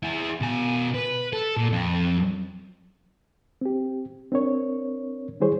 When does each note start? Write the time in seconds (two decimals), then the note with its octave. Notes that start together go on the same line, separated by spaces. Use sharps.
0.03 E4 G#4
0.41 B2 G#5
0.94 B4
1.33 A4
1.57 A#2
1.72 F2
3.61 C4 G4
4.32 C4 D4 A#4 C#5
5.40 D#3 G3 E4 G#4 C5 C#5